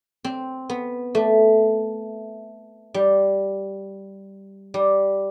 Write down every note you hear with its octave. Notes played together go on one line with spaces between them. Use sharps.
C4
B3
A3
G3
G3